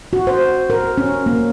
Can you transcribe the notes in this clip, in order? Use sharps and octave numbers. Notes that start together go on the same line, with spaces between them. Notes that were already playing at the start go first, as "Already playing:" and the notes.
F#4
C5
A#4
C#4
A#3